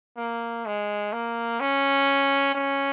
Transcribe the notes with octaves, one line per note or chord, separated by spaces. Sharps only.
A#3
G#3
A#3
C#4
C#4